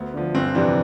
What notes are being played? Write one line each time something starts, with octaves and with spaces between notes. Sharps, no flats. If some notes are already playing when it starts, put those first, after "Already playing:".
Already playing: D2 B3
D3 F3
G1 C4
F2 C3 E3 D4